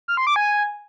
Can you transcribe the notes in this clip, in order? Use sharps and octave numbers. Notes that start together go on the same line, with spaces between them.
F6
C6
D6
G#5